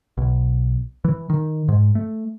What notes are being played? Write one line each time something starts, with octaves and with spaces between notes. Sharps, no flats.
B1
E3
D#3
G#2
A3